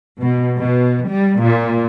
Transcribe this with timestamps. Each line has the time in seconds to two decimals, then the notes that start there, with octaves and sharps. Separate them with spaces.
0.21 B2
0.58 B2
1.07 G3
1.41 A#2